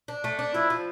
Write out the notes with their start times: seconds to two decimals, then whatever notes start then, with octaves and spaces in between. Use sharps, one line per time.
0.08 D4
0.24 A3
0.39 D4
0.55 F3 E4
0.70 F3